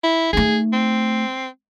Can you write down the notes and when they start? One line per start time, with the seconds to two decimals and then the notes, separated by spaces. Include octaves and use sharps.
0.04 E4
0.33 A3 D#4 G#4
0.73 C4